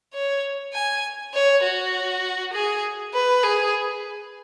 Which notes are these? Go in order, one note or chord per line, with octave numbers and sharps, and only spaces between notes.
C#5
G#5
C#5
F#4
G#4
B4
G#4